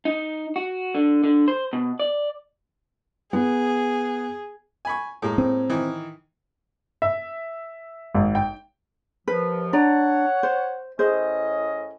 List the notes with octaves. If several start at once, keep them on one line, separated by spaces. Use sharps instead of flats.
D#4
F#4
D3
D3
C5
B2
D5
B3 G#4
G#5 B5 C#6
A2 G#3 A#3
C4
D#3 E3
E5
G#1
G5
D#2 F3 B4
D4 C#5 D5 F#5 A#5
C5
A2 C#4 G#4 C5 D#5